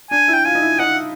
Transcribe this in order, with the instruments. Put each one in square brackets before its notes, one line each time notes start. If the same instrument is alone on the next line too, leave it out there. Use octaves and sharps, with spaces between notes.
[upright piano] D4 [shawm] G#5
[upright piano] E4
[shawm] G5
[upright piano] F4 [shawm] G#5
[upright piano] D#4
E4
[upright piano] D#4 [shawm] F#5